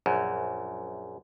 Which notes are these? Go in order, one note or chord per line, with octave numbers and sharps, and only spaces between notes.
A#1 F#2